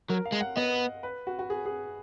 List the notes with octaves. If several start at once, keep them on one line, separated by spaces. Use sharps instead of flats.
F#3 A#4
F5
G#3
F#5
B3 D#5
B4
F#4
F#4
G#4
G#4